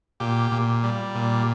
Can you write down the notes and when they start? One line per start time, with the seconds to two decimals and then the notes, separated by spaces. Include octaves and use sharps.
0.20 A#2 G4
0.52 A#2
0.84 G3
1.15 A#2